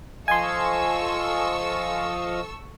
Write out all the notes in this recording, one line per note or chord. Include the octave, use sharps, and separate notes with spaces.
F3 A4 D#5 F5 G#5 C6 C#6 E6